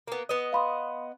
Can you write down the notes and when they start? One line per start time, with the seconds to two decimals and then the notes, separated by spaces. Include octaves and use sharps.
0.08 A#3 B3
0.29 B3 D#5
0.53 F5 B5 C6